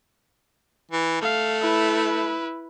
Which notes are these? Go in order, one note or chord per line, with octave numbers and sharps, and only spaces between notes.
E3
A3 F5
E4 B4